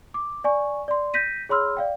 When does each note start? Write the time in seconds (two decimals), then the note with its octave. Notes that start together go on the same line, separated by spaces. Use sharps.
0.14 D6
0.44 D5 G#5 C#6
0.88 D5 C6
1.14 G6 A#6 B6 D#7
1.49 G#4 C#5 B5 C6 E6 F6
1.77 D5 F5 G5